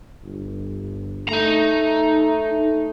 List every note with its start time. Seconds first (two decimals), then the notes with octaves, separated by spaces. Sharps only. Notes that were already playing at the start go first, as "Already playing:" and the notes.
0.23 G1
1.29 A3 D#4 A#5